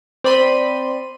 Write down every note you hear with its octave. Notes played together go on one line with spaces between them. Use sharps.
C4 D5 B5 C6 D#7